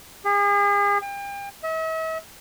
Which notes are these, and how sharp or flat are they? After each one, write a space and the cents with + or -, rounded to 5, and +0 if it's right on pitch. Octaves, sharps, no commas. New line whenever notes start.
G#4 -40
G5 +35
E5 -45